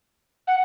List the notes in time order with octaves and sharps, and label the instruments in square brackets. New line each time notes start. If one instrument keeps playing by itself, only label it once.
[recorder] F#5